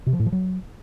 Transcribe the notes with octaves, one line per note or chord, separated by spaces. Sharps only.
C3
F3
A2
F3
F#3